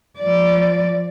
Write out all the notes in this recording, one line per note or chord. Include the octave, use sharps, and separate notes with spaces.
F3 D5